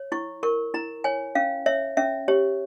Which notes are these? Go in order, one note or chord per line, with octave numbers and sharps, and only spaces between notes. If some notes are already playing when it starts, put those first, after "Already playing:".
Already playing: C#5
E4 C#6
A#4 C#6
E4 A#5
C#5 G#5
C#4 F5
C#5 E5
C#4 E5
G4 C#5